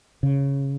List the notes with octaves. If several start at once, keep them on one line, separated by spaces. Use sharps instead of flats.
C#3